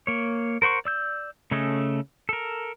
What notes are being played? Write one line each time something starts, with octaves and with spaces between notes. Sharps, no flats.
A#3 C#5
A#4 C5 F#5 C#6
D5 E6 G6
C#3 A3 C#4 A4 D#5
A4 A#4